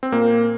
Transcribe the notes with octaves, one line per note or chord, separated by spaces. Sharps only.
C4
A#2 A#3